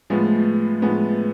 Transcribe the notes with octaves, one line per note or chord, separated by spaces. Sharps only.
A2 F3 G#3 B3
A2 F3 G#3 B3